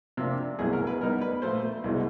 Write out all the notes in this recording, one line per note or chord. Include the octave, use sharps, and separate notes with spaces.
C3 F3 A#3 D4
C2 B2 F#3 A3 G#4
A#4
B4
B2 G3 B3 D#4 A#4
B4
A#2 F3 A3 C5
C2 B2 G#3